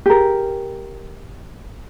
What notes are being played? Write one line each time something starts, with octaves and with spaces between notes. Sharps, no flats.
G4 G#4 A#4